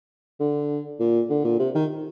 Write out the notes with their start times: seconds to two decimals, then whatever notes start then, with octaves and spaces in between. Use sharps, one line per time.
0.40 D3
1.00 A#2
1.30 D3
1.44 A#2
1.59 C3
1.75 D#3